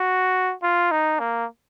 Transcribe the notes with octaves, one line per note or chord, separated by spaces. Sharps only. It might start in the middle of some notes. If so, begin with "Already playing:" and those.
Already playing: F#4
F4
D#4
A#3